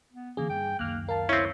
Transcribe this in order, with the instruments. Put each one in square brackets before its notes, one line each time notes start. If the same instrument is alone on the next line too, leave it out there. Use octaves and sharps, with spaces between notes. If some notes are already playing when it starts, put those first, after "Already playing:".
[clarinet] B3
[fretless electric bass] D3 E3 C#4 [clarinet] A#3 [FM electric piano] G#4
[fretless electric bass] G2 [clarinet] G5
[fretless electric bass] C#2 F#2 D#3 [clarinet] A#3 [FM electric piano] F6 F#6
[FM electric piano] A#4 A5 [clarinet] F5
[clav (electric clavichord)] C4 C#4 [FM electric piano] E4 C#5